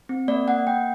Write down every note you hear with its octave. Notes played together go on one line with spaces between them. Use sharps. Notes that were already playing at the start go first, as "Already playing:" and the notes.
C4
A#3 D5
A#3 F#5
A#3 G5